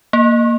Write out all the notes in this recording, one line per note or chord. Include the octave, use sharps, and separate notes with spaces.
A#3